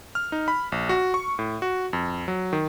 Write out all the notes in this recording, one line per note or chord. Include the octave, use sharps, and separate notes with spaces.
F6
D#4
B5
A#1
F#4
C#6
A2
F#4
F2
F#3
D#3